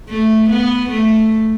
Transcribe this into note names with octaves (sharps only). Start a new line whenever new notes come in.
A3
B3
A3